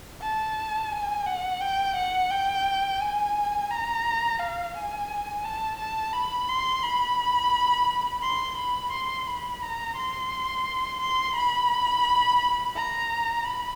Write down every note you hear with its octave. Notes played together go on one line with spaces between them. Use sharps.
A5
G#5
F#5
G5
F#5
G5
G#5
A#5
F5
G#5
A5
A5
B5
C6
B5
C6
B5
C6
B5
A#5
C6
C6
B5
A#5
B5